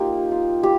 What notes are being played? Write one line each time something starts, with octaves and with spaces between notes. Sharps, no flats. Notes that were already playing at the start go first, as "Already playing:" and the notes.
Already playing: A#3 D#4 F4 G4
F4
G4